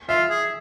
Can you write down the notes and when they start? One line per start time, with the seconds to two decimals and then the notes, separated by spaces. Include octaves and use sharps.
0.09 F4 E5
0.30 G#4